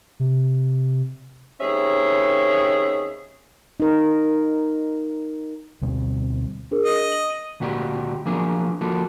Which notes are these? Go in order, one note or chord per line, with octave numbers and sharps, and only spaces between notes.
C3
D#2 C4 C#4 G#4 E5
D#4 A#4
D2 B2 G3 C4
D4 G#4 A#4
D#5
F#7
D#7
D2 A#2 F#4 G4 A4 D5
F3 F#3 A#3 B3 D4 G#4
F3 A#3 F#4 A4